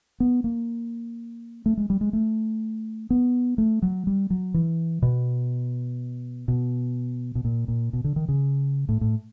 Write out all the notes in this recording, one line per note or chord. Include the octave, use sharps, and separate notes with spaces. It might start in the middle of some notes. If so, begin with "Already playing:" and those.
B3
A#3
A3
G#3
G3
G#3
A3
B3
A3
F#3
G3
F#3
E3
B2
B2
B2
A#2
A#2
B2
D3
D#3
C#3
A2
A2